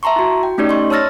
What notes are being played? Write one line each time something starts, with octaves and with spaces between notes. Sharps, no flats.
E5 A5 A#5 C6 C#6
E4 F#4
G5
A3 C#4 D#4 G4 D5
D#5 C6 C#6
C#5 A5 E6 F6 A6 A#6